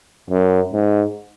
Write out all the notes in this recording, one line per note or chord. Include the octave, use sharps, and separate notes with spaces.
F#2
G#2